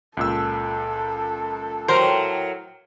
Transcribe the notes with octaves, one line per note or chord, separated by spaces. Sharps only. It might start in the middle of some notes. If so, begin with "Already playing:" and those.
C#2 A#2 A4 E6
A2 F#3 A#4 C5